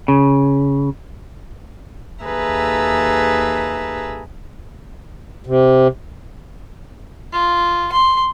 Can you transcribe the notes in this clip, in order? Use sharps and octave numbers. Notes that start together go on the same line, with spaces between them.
C#3
D#2 G#4 A4 B4 E5 A#5
C3
F4
C6